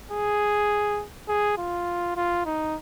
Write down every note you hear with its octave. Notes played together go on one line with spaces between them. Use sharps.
G#4
G#4
F4
F4
D#4